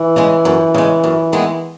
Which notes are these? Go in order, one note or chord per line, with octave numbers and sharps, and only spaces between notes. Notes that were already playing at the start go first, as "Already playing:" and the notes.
Already playing: E3
C#3 G#3
F#2
C#3 G#3
F#2
D#3 G#3 B3 E4